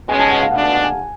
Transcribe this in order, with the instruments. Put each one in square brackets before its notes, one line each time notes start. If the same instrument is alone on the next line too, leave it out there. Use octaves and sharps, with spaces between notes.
[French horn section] B2 G#3 C#4 [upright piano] G#5
[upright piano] A5
F#5
F5
[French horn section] B2 A3 D4 [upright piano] F#5
[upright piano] A5
F#5
G#5